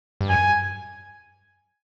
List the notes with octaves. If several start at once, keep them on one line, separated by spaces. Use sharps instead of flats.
G2
F#2 G#5